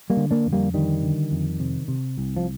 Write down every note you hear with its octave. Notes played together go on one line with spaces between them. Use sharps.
G3 A#3
D3
A#3 D4
F2
G3 A#3
D3 D#3 G3
D3
F2
C3
C3
C2
F3